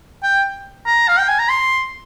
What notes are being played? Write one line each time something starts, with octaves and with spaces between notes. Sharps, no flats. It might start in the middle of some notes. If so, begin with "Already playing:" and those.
G5
A#5
F5
G5
G#5
A#5
C6